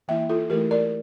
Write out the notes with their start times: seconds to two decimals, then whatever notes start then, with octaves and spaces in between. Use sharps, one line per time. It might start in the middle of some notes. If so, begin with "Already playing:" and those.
0.08 E3 A#3 E4 E5 G5
0.29 F4 A4
0.50 E3 A3 E4 G4 A#4
0.71 A#4 D5